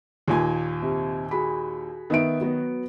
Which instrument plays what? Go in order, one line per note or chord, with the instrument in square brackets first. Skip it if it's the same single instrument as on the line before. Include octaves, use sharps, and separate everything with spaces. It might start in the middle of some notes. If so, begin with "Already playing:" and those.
[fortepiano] D#2 A#2 G#5
[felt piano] C3
F#4 G#4 B5
[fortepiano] D#3 [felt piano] B3 E5 D7
[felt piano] F#3 B3 F#4